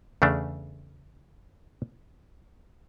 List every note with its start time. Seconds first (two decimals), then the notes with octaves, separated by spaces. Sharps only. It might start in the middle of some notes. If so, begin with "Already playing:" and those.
0.22 E2 C#3 A3 D4